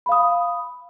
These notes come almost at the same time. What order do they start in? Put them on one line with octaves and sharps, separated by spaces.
B5 F5 D#6